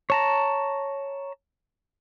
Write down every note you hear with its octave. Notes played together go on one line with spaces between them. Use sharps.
C#5 A5 A#5